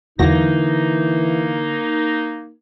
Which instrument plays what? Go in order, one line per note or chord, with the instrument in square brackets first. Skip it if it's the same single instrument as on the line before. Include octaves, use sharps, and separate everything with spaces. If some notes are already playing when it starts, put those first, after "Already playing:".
[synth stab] E2 F#3 A#6 [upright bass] D3 [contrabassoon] E3 [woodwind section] A#3 D#4